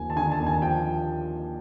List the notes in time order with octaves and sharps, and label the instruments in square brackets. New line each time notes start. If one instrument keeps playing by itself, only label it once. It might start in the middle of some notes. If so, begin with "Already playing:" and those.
Already playing: [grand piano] D#2 F3 G#5
A5
D3 G#5
A5
D#2
G#5
F3 G5